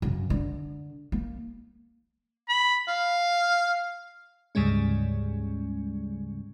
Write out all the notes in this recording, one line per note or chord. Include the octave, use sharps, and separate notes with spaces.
F#2 C#3
D3
A#3
B5
F5
D2 G#2 C#3 G3 G#3 C#4